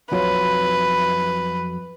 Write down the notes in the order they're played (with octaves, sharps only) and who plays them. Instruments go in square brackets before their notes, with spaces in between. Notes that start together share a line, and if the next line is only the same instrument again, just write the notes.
[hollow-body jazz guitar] F2 F#3 F4 [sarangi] B4